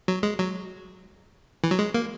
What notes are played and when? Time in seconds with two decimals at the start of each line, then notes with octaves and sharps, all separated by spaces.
0.08 F#3
0.23 G#3
0.39 F#3
1.64 E3
1.71 F#3
1.79 G#3
1.95 A#3